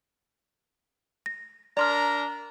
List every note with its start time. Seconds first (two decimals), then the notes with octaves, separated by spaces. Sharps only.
1.26 A#6
1.77 D4 A#4 D5 A#5 C6 F6